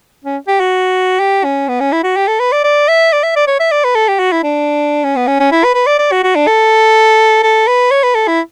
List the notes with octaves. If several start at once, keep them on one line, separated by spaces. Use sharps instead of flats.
C#4
G4
F#4
G4
C#4
B3
C#4
E4
F#4
G4
A4
B4
D5
D5
E5
D5
E5
D5
C#5
E5
D5
B4
A4
G4
F#4
E4
D4
C#4
B3
C#4
C#4
E4
B4
B4
D5
D5
F#4
F#4
D4
A4
A4
B4
C#5
B4
A4
E4